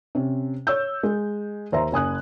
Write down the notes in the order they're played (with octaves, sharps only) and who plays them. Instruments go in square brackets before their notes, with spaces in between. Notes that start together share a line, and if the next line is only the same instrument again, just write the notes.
[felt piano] C3 C#4
C#5 E6 G6
G#3
D#2 C5 E5 A#5
F#1 G#5 D#6 F#6